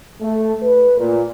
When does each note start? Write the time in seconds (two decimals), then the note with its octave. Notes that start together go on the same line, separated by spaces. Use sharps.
0.21 A3
0.62 B4
0.99 A#2